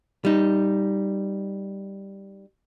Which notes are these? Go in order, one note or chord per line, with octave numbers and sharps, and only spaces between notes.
G3 D#4